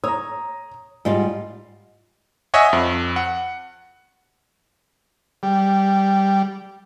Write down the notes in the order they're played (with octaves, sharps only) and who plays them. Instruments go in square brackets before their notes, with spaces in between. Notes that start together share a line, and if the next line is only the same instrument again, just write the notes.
[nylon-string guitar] C#5 [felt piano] A#5 D#6
[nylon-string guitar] G#2 G3 F4 [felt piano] D#5
[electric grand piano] C#5 D#5 E5 F#5 G#5
F2
F#5
[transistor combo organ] G3